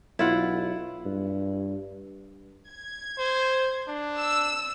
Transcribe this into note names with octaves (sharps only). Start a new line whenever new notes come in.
B1 E4 F4 F#5
G2
G#6
C5
D4
E6